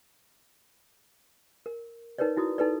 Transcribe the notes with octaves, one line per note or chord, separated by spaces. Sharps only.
A#4
D#4 A#4 B4 C#5 D5
D#4 E4 F#4 D#6
D#4 A4 B4 D5